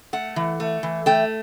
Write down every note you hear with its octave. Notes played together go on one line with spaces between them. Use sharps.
A3 F#5
E3
A3
E3
A3 G5